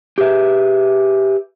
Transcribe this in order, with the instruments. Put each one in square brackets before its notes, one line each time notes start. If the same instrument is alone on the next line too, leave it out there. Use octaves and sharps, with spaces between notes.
[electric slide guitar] G4 G#4 B4 E5